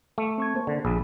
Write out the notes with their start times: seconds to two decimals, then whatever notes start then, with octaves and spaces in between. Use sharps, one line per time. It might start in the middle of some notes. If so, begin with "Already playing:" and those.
0.18 A3
0.38 C4 C#6 G#6
0.54 A#3 C5
0.67 D3
0.85 A#1 G#4 B5